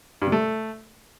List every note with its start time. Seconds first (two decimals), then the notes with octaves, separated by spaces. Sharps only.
0.22 G2
0.27 C3
0.32 A3